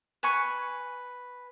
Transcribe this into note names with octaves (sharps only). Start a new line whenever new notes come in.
B4 G#5 C#6